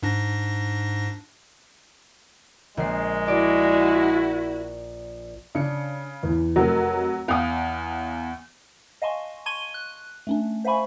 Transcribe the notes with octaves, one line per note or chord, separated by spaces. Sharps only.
G#2 D4 A#6
A#1 G#3 C7
E4 F#4 D5
C#3 D4 C#7
E2
F1 F#3 A4 A#4
E2 F5 D#6
D#5 F5 G#5 A5 C6 C#6
A5 C6 C#6 G#6 D#7 G7
F#6
A3 C#4 D4
C5 E5 F5 G#5 B5 C#6